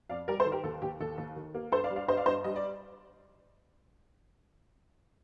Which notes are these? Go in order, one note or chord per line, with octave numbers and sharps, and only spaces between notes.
F2 D5 F5
G3 A#4 D5
A4 C5
D#3
G4 A#4
D#2 A4
D#2 G4
D#2 A4
D#2
D#3
A#3
G2 A4 C5
D5 F5
G3
D5 F5
G2 C5 D#5
D5 F5
G2 C5 D#5
G3 D#5
D5